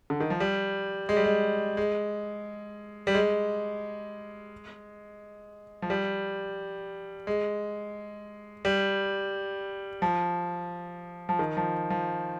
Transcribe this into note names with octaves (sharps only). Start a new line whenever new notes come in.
D3
D#3
F3
G3
G#3
G3
G#3
G#3
G3
G#3
F3
G3
G#3
G3
F3
F3
D#3
F3
F3